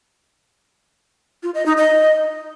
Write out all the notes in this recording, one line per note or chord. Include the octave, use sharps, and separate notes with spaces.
F4
D#5
D#4
D#5